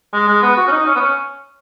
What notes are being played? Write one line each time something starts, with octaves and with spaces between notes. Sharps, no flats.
G#3
G#3
B3
F#4
C#4
D#4
C#4
B3
C#4